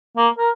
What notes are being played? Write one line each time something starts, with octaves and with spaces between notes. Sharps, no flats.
A#3
A#4